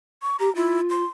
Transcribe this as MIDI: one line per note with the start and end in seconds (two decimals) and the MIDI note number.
0.22 0.37 85
0.39 0.50 67
0.39 0.52 82
0.55 0.81 64
0.55 1.02 65
0.90 1.07 84